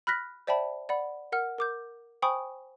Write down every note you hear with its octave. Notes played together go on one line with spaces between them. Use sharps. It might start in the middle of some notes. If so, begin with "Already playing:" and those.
B5 F6 F#6 A#6 B6
C5 D5 E5 G5 A5 B5
D5 F#5 B5
A#4 F#5 F6
A#4 D6 G6
C5 G5 G#5 B5 C#6 D#6